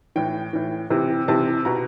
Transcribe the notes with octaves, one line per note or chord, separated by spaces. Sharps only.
A2 E3 G5
A2 E3
C3 E3
C3 E3 A5
B2 A#5